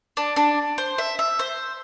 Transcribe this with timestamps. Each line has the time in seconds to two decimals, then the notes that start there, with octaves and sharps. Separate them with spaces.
0.17 D4
0.36 D4
0.78 C5
0.98 E5
1.19 E5
1.39 C5